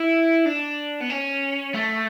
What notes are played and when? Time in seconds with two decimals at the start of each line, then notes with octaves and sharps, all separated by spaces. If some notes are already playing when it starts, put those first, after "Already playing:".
Already playing: E4
0.45 D4
1.00 B3
1.10 C#4
1.75 A3